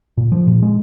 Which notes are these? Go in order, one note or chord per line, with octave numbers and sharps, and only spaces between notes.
A#2
F3
A#2
G#3